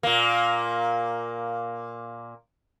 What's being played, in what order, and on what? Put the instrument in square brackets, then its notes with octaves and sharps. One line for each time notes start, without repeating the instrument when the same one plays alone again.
[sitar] A#2 A#3